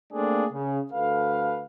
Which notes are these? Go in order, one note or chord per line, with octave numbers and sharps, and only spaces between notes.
A3 A#3 C4 D4 G#4
C#3
D2 A4 B4 F5